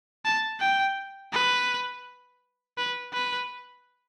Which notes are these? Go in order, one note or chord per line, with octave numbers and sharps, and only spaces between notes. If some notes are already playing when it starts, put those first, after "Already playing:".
A5
G5
B4
B4
B4